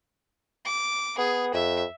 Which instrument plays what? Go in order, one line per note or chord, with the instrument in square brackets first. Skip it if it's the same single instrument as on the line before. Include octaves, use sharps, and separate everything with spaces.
[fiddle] D6
[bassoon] B3 [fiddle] G#4
[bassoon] F2 [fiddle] E5